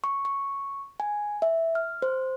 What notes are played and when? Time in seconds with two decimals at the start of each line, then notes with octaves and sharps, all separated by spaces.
0.04 C#6
0.25 C#6
1.00 G#5
1.42 E5
1.75 F6
2.02 C5